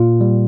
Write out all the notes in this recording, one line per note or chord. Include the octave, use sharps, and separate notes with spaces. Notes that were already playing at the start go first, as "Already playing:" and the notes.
Already playing: A#2 F4
G3